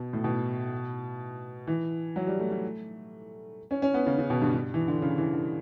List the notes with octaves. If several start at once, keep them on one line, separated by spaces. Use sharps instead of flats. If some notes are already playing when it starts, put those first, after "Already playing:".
Already playing: B2
A2
B2
E3
F#3
G3
A3
A3
C#4
C#4
B3
C#3
C#3
B2
G2
G2
E3
D3
C#3
E3
D3